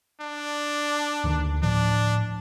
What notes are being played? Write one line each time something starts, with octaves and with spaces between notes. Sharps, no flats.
D4
D2 D3 D#3
A2 F3 D4